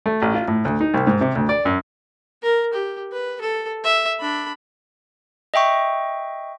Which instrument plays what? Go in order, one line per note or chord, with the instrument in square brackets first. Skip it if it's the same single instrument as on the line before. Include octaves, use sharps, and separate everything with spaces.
[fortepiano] A3
A1
F4
A2
D2
D#4
C2
G#2
C3
D2
D5
F#2
[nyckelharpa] A#4
G4
B4
A4
E5
D4 B5
[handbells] D#5 E5 G5 C#6